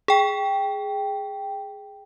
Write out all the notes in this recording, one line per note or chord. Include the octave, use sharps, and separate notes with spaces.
G#4 G5